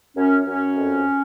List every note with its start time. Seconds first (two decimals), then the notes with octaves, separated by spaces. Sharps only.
0.16 F#2 C#4
0.46 F#2 C#4
0.75 F2